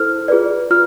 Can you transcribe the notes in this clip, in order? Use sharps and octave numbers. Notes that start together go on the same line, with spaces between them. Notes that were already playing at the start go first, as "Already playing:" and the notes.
Already playing: E4 A4 C5 F6
F4 G#4 B4 D5
F4 F6